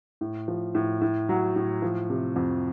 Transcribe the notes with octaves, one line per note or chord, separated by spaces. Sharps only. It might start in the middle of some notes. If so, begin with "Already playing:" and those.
A2
F3
A2
A2
F#3
A2
F3
C3
F2